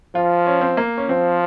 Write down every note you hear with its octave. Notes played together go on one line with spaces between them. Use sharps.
F3 F4
C#4
C4
A#3
C#4
F3 C4